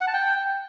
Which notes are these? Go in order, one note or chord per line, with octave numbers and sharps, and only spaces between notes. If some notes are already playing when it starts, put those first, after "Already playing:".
F#5
A5
G5